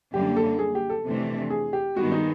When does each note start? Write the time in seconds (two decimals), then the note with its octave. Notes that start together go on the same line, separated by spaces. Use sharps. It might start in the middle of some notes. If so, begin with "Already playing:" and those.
0.14 F#2 D3 G3 A#3 G4
0.36 A4
0.59 G#4
0.75 G4
0.90 A4
1.05 F2 C3 E3 A3 D4
1.50 G#4
1.73 G4
1.96 G2 D#3 G#3 B3 F#4
2.12 D#4